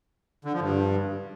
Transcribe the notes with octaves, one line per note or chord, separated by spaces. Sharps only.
D3
F3
G2